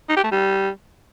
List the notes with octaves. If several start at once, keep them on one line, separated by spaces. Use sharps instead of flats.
D#4
G4
A3
G3